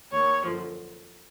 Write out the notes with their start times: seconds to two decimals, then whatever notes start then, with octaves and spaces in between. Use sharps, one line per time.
0.12 D#2 D#3 C#5
0.45 F#2 D3 F3